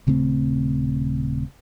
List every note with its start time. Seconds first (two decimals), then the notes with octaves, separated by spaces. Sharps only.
0.07 D#1 C#3 A3 C4